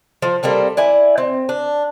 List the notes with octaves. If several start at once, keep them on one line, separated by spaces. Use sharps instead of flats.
F3
G3 A#3 C4 A4
E4 D5 G#5
C4
D4